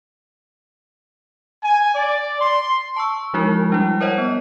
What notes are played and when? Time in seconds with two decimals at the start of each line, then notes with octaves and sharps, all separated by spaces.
1.63 G#5
1.95 D5
2.40 C6
2.96 A5 C#6 E6
3.34 F3 G#3 D#4 E4 F#4 A#4
3.70 G3 D4 E4
4.01 A#4 C5 C#5 D#5 F#5
4.18 B3